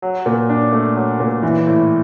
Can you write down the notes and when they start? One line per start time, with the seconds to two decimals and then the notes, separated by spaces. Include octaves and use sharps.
0.02 F#3
0.26 A#2
0.49 D4
0.73 A3
0.96 F#3
1.20 A#2
1.43 E3
1.67 A2